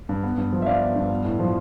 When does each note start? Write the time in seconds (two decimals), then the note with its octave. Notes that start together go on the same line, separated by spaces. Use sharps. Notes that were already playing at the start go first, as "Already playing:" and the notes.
0.09 G2
0.23 B3
0.38 G2
0.52 F3
0.62 E5
0.66 D4 D5 F5
0.82 B3
0.96 G2
1.10 B3
1.25 A2
1.39 F3